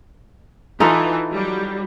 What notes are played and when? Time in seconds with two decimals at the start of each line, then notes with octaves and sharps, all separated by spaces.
0.80 E3 D#4 F4 A4
1.33 F#3 G3